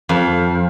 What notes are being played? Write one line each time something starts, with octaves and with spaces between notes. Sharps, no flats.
F2